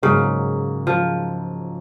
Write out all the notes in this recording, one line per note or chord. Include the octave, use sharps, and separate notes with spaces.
G#2 C#3 F#3 A#3
F3